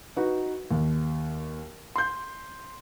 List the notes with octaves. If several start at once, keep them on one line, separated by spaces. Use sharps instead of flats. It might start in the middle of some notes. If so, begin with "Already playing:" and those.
D#4 F#4 B4
D#2
C6 G6